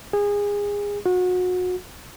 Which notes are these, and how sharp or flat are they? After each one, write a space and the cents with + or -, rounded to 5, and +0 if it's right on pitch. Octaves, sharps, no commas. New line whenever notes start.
G#4 -25
F#4 -30